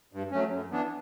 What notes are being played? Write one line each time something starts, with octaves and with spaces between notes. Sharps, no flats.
G2
F#3 A3 C#4
F#2
E3 B3 D4